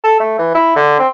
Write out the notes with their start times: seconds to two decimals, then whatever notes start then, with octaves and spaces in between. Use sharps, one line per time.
0.04 A4
0.20 A3
0.39 E3
0.55 E4
0.76 D3
0.99 C4